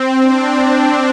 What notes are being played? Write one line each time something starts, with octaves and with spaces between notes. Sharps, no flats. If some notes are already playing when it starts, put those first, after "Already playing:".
Already playing: C4
D4